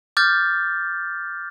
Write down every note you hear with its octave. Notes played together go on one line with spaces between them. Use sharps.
D6 F6 G6 A6